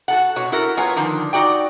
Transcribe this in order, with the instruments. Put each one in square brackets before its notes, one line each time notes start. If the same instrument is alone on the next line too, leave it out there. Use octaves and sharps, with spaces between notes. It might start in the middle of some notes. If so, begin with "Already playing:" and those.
[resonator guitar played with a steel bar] F#4 A4 F#5
B2 F#4 C#5
E4 F#4 A4 A#4
F#3 B3 F4 C#5 G#5
D3 D#3 F3
D#4 F#4 D5 G5